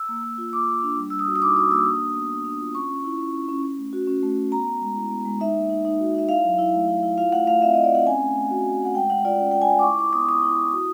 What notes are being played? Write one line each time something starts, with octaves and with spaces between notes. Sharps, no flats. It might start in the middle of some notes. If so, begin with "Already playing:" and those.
Already playing: E6
A#3
A#3
F4
A#3 D6
A#3
D4
G3
G3 E6
D#6
F#4
D#6
D#4 D6
F#4 D#6
A#3 E6
D4 D#6
D4
B3
D4
D4
F4
C#4 C#6
C#4
E4
C#4
C#4
C#4
C#4
A3
F#4
C#4
A3
F#4
B3 A#5
B3
G#3
E4
B3
G#3
D#4 E5
A#3
D#4
D#4
F#4
D#4 E5
E4 F5
F#3
E4
A3
E4
E4
F4 F5
A3 F#5
A3 F5
C4 E5
A3 D#5
D5
C4 F#5
C#4 G#5
A3
A3
F#4
A3
A3 F#5
G#3 G5
G#3 F#5
F4 D5
C#4 G5
F4 G5
G#5
G#3
D6
E4 C#6
E4 D6
B3 D#6
E4 D#6
E4
E4
F#4